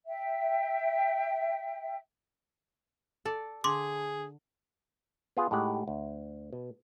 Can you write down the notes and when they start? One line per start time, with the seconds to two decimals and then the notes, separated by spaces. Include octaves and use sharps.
0.06 E5 G5
3.25 A4 D5
3.64 D3 G#4 C6 D6
5.37 B3 F4 G#4 G#5
5.51 A2 G#3 D#4 G4 F#5
5.88 D2
6.53 B2